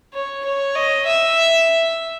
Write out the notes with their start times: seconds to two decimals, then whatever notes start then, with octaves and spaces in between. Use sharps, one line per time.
0.14 C#5
0.45 C#5
0.76 D#5
1.06 E5